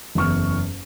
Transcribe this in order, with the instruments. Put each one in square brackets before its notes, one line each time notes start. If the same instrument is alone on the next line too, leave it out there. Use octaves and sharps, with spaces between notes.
[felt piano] F#1 E2 C#6 F6